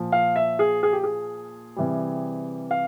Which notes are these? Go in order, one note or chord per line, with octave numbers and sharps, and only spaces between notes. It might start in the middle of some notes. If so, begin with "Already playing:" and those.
Already playing: A#2 F3
F5
E5
G#4
G#4
G4
G#4
C3 E3 G3
F5